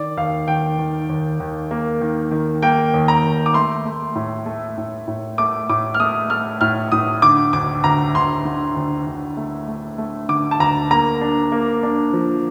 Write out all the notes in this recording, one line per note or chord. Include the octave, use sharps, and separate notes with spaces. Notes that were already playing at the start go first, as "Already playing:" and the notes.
Already playing: D#3 D5
D#2 F5
D#3 G5
D#3
D#2
D#2
A#3
D#3
D#3
A#3 G5
D#2
A#5
D#2
D6
A3 C6
A3
A2
A3
A2
A2
A3 D6
A2 D6
F6
A3 D#6
A3 F6
A2 F6
A2 D#6
D3 D6
D2 D6
D2 A#5
D2 C6
D3
D2
D2
A3
A3
A3
D3 D6
A5
D2 A#5
A#3 A#5
D4
A#3
D4
F3